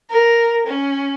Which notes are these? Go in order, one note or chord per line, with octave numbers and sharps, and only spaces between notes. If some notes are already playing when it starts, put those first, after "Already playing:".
A#4
C#4